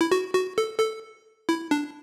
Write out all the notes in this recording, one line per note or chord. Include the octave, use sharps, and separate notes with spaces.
E4
F#4
F#4
A4
A4
E4
D4